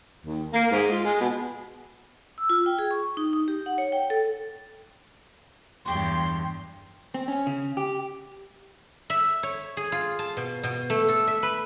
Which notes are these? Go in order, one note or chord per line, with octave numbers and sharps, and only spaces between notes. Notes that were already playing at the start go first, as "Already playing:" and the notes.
D#2
A#3
G#2
F4
G#3
B2
E6
F4
G5
G#4
C#6
D#4
D#4
G4
F#5
C#5
G5
A4
E2 G2 F#4 G4 G5 C6
C4
C#4
C#3
G4
E5
C#5
G#4
F4
A5
B2
B2
A3
A4
E5
B4